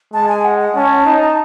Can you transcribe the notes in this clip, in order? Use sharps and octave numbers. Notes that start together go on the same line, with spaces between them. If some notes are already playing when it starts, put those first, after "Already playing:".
G#3 A5
G#5
F#5
F#5
C#4 A5
D#4